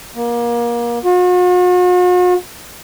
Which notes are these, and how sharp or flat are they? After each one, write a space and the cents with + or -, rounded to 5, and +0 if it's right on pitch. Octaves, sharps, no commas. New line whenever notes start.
A#3 +30
F#4 -45